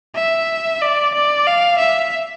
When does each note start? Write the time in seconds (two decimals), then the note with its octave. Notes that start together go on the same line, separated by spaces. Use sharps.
0.16 E5
0.82 D5
1.15 D5
1.47 F5
1.79 E5